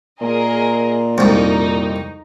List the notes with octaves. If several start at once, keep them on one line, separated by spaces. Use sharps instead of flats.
A#2 G#4 A#4 D#5
C2 F2 D#4